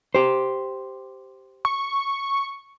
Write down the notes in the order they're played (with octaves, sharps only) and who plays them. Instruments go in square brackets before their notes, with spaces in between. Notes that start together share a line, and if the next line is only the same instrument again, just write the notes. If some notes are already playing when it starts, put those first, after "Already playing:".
[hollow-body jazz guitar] G4 C5
[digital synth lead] C#6